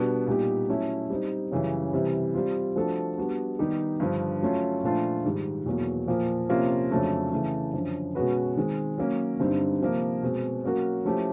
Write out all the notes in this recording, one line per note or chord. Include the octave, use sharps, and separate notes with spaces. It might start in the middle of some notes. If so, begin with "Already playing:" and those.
Already playing: B2 G3 B3 D4
A#2 G3 B3 D#4 G4
F#3 A3 C#4 E4
G3 C4 D#4
F#2 C#3 E3 G3
C3 E3 G3
G3 C4 F4
F3 A3 D4 F#4 A4
G3 B3 D4 F#4
D#3 G3 B3 D#4 G4
G2 D3 F3
F#3 A3 C#4 F4
A#2 F3 A3 D4 F4
G#2 D#3 G3
E2 B2 F#3 A#3
A#2 F3 A#3
C3 F3 A#3 C#4 F4
F2 C#3 F#3 A3 D4
C#3 E3 A3
F#2 D3 F3
B2 G#3 C#4 F#4 B4
D#3 G#3 C4
F#3 A#3 C#4
G2 D3 G3 C4 D#4
C3 F3 A#3
B2 G#3 C4
F#3 A#3 C#4 F#4 A#4
F3 A3 C#4 E4 G4